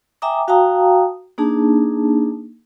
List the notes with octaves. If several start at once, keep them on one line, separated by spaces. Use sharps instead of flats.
E5 G5 G#5 A#5 D6 D#6
F#4 F5 G5 A5 A#5 D#6
A#3 D4 D#4 G#4 A5